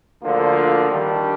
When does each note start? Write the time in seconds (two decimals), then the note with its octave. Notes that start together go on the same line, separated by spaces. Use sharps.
0.22 D2 D3 F3 A#3 F4
0.88 D#3 G3 D4